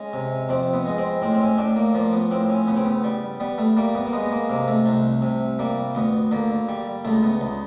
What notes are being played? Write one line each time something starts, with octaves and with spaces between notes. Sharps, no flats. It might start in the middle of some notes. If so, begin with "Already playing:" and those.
Already playing: G#3 C#4
C3
F2 C4
B3
G#3
C4
A2 C4
C4
C#4
A2 D4
A#3
F3 A#3
B3
A2 C4
C#4
C#3 B3
C4
B3
G3
G3 B3
A3
G3 A#3
B3
A#3
G#3 B3
B3
A#3
C3 A#3
A3
C2
C3
G3 A#3
D2 B3
D3 A#3
G3
C#2 A3
B3
C#2